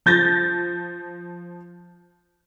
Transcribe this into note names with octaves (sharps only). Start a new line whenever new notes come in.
F3 G6 A6 A#6